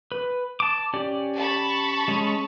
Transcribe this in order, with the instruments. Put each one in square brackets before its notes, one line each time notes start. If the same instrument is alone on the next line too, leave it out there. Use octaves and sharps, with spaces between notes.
[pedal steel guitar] B4
A5 D6
C#4 G4 D5
[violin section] A5 B5 C#6
[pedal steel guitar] G#3 C#4